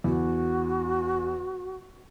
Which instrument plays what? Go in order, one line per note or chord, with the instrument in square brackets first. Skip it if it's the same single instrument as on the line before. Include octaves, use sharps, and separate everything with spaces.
[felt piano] E2 [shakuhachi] F#4